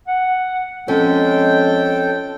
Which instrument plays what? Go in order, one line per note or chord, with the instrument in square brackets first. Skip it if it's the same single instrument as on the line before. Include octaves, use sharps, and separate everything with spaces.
[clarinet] F#5
[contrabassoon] F2 [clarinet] G#3 [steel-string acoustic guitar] C#4 [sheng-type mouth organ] A4 G5